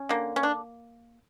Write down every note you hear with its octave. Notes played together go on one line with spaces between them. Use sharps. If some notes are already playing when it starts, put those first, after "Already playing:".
Already playing: C#4
D3 A#3
C#4
D4